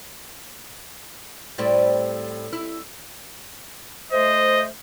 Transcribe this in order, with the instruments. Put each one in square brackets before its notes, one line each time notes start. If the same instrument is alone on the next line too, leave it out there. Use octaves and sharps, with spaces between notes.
[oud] A2 G3 C4
E4
[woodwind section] A3 C5 [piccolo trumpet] D#5